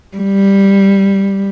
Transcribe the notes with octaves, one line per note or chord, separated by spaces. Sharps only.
G3